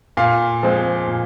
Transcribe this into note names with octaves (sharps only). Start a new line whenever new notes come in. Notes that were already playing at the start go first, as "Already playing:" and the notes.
A#2 F5
F3 G#3 C4
A#2